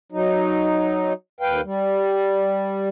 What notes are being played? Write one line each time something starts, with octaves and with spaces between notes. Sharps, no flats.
F#3 D#4
D#2 B4 F5 G5
G3